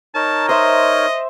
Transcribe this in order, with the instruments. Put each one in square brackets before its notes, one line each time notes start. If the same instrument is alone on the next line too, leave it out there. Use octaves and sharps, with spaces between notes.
[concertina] D#4 A#4 C#5 [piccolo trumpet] A5
[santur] C5 E5 [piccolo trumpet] D#5